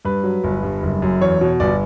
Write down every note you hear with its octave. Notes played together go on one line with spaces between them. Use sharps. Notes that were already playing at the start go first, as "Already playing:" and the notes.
G2 B4
F#3
G1
G2
F#1
F#2
E2 C#5
B2
G1 D5